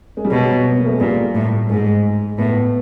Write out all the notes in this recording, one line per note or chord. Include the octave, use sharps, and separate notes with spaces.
G#3
G3
B2 F#3
B3
A#3
A3
G#3
A#2 G3
A2
G#2 G#3
A2 B3